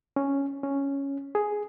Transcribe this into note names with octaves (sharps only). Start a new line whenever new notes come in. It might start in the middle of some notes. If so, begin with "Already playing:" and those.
C#4
C#4
G#4